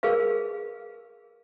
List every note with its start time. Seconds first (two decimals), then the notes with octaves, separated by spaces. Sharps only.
0.03 G#4 A#4 B4 F5